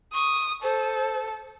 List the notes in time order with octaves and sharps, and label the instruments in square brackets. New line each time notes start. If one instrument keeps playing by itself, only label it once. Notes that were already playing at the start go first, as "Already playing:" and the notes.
[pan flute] C#6 [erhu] D#6
[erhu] A4 [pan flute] C5